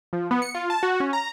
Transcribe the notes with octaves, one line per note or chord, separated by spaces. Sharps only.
F3
B3
C#7
F4
A5
F#4
C#4
A#5